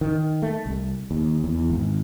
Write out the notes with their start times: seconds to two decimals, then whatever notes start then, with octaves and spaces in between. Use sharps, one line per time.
0.01 D#3
0.42 A3
0.66 C2
1.11 D#2
1.44 E2
1.70 G#1